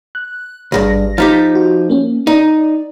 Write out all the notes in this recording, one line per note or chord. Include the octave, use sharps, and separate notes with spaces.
F#6
G#1 C#2 G2 G#4 A#6
F3 D#4 G4 A6 B6
F#4
A#3 C#4
D#4 D5